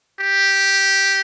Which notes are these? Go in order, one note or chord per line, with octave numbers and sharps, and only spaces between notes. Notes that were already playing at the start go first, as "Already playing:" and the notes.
G4